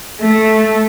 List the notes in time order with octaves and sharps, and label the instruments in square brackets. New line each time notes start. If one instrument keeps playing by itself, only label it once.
[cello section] A3